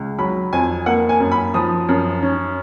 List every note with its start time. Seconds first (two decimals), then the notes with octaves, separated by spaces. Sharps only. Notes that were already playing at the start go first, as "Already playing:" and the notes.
Already playing: C#2
0.19 F#3 B5
0.53 F2 G#5
0.86 A#3 F#5
1.09 G#5
1.20 F#2
1.31 B5
1.54 F3 D#6
1.89 F#2
2.22 C#4